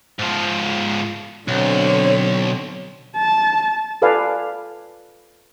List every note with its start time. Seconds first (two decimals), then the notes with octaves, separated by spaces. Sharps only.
0.19 G#2 F3
1.48 B1 D3 C4 C#5
3.16 A5
4.02 F4 A4 B4 D5 F5 G#5